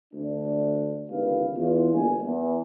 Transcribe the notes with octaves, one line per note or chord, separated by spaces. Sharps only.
D2 D4
G1 C#2 D#3 G4 B4 F5
E2 F4
G1 G3 A#3 G#5
E2